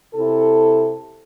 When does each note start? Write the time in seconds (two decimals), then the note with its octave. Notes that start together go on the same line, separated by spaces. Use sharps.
0.14 C3 E4 A4